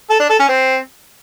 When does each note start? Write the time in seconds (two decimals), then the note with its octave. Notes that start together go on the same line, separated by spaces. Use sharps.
0.10 A4
0.19 D4
0.29 A4
0.39 C#4
0.49 C4